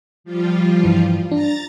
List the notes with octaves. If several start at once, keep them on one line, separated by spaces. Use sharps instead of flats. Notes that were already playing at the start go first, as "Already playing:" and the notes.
F3 G3 F4
G2 E3
D4 A#5 A6